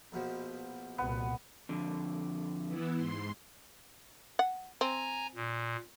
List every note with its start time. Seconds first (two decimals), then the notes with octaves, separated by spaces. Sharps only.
0.12 A#1 B2 F3
0.98 C2 A#2 B3
1.69 F2 D3
2.67 E3 B3 E4
2.96 G#2 C6
4.39 F#5
4.81 C4 G#5 A#5
5.35 A#2